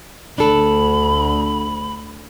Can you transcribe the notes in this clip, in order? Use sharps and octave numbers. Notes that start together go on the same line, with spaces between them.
D2 D4 A4 B5